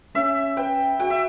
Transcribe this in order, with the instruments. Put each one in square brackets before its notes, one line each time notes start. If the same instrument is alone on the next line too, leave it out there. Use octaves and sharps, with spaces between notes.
[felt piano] C#4 [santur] E5
[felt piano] B4 [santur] G5
[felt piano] F#4 [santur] G5
[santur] E5